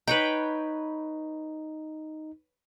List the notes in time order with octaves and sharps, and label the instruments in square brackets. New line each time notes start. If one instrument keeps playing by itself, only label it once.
[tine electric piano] D#4 [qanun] B4 C#5 G5